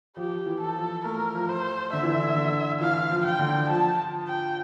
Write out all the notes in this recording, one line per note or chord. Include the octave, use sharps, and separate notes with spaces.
F3 G4
E3
A4
F3
A3 A#4
F3
C5
D3 E5
E3
D3
D3
E3 F5
F3
G5
D3
F3 A5
G5